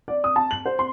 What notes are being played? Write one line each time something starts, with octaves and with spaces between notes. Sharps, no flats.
D5
D#6
A5
F#7
C5
C6